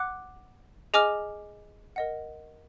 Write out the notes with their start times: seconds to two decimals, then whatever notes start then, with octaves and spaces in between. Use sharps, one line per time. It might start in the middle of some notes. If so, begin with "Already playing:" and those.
Already playing: F#5 D6 F#6
0.94 G#4 D#5 G#5 D6 F6
1.96 A#4 D#5 F#5